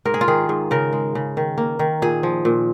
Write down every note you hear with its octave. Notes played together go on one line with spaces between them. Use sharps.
G#2 A#4
G#4
F4
D#3 G#4
G#2
C#3 A#4
G#3
C#3
D#3
A#3
D#3
A#2 G#4
F3
A#2